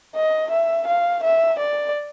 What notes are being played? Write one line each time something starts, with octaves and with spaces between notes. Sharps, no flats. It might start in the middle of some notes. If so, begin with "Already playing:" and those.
D#5
E5
F5
E5
D5